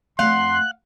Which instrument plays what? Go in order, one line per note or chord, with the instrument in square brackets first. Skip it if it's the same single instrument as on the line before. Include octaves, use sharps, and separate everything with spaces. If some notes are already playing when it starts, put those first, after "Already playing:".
[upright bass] F2 A3 [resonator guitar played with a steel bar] F5 F#5 [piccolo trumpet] C6 [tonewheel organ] F#6